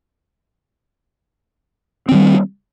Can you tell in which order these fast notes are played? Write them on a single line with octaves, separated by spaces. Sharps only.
C4 D#3 G3